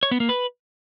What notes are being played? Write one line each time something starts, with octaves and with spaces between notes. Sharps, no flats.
C#5
B3
A#3
B4